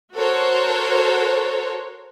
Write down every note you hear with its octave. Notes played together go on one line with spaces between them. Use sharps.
F#4 A4 A#4 C5 C#5